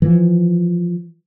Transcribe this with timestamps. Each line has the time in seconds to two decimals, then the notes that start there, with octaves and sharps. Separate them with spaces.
0.02 E3 F3